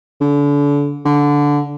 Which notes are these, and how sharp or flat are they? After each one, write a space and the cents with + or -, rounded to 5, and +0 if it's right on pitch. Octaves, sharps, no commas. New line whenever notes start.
D3 -35
D3 -15